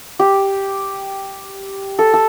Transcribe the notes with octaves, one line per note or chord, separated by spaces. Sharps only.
G4
A4
A4